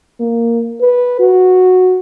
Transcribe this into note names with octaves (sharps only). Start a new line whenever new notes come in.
A#3
B4
F#4